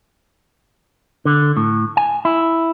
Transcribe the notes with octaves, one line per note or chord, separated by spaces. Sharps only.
D3
A2
G#5
E4